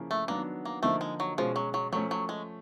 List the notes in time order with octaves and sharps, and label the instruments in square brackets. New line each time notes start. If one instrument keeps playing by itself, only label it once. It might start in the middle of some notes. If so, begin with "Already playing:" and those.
Already playing: [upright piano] C#3 F3 A#3 C#4 E4
[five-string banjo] A3
[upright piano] D#3 F#3 B3 D4 [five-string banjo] A#3
[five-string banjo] A#3
[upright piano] D3 F3 A#3 D#4 [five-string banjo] A3
[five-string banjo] G#3
F#3
[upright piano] B2 G#3 C#4 [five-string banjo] F3
[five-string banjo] F#3
F#3
[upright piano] F3 A3 C#4 [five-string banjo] F#3
[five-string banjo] F#3
G#3